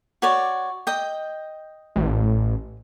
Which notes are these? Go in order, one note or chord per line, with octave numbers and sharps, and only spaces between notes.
F#4 C#5 D5
D#5 G5
A1